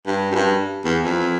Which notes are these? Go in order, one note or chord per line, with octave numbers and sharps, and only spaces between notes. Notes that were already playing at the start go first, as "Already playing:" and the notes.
G2
F#2
G2
E2
F2